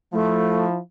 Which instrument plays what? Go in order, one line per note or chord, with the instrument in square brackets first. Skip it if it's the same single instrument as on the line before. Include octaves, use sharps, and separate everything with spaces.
[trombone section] F3 E4 [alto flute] A3